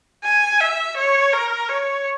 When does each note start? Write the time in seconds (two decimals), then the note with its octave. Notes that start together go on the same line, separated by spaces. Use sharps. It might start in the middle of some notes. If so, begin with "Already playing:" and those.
0.24 G#5
0.60 E5
0.97 C#5
1.33 A#4
1.69 C#5